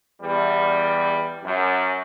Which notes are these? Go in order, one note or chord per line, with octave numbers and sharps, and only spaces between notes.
E2 G3
F#2